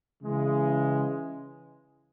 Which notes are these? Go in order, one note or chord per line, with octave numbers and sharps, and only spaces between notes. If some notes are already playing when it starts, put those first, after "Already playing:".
C#3 E3 G#3